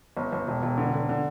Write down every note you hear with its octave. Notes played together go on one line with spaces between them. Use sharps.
G1
G1
E1
E1
D3
D3
D3